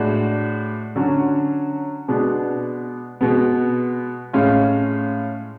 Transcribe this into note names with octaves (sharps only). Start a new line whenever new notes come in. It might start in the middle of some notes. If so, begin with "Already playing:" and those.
Already playing: A2 G#3 D4 F#4
D3 F#3 C#4 F#4
B2 G#3 B3 D4
B2 G#3 B3
A2 G#3 C#4 F4